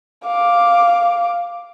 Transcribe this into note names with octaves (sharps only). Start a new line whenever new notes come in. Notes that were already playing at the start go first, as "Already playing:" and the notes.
F5 D6